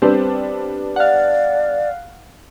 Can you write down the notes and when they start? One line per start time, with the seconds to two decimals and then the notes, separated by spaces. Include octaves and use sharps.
0.02 G3 B3 C4 D4
0.96 D5 F5 F#5